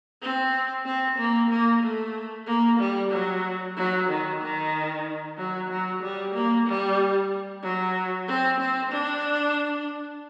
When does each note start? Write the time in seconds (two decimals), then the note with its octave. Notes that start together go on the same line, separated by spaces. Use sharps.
0.22 C4
0.85 C4
1.18 A#3
1.50 A#3
1.83 A3
2.47 A#3
2.79 G3
3.11 F#3
3.77 F#3
4.09 D#3
4.41 D#3
5.37 F#3
5.69 F#3
6.02 G3
6.34 A#3
6.67 G3
7.63 F#3
8.28 C4
8.60 C4
8.92 D4